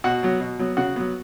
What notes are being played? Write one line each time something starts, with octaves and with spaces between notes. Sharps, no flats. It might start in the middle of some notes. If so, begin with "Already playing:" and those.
B2 F#4 F#5
F#3 B3
B2
F#3 B3
C#3 F#4 F#5
F#3 B3